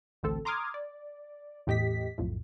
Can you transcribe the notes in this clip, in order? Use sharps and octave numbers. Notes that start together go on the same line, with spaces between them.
A1 D2 C4 A4
A#5 C6 D6 D#6 F6 G#6
D5
E2 A2 G4 D#5 B6
B1 F2 A2